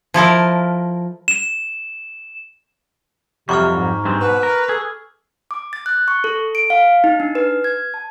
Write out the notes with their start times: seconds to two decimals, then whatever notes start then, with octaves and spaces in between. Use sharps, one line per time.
0.14 F3 E4 A4 A#4
1.28 E7
3.49 F2 C3 F#3 G3 C#6 D6 F6
3.75 G#2
4.05 G2 G#3 C4
4.20 B2 B4
4.43 A#4
4.69 G#4 A4
5.51 D6
5.73 A6
5.86 F#6
6.08 C#6
6.24 A4
6.55 D7
6.70 F5
7.04 D#4
7.20 D4
7.35 B4
7.64 G#6
7.94 A5